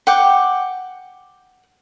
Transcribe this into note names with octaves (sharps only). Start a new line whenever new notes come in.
F#5 G5 D6